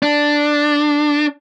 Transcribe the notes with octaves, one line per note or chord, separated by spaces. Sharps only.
D4